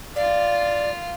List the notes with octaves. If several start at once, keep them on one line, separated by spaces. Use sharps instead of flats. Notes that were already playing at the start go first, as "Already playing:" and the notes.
F4 D5 F5